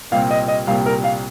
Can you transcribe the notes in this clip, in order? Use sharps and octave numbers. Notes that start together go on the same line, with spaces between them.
C2 A#2 G3 C4 F5
D#5
D#5
C2 A#2 G3 C4 F5
A#4
F5